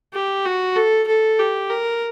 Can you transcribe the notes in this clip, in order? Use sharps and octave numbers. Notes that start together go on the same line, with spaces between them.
G4
F#4
A4
A4
G4
A#4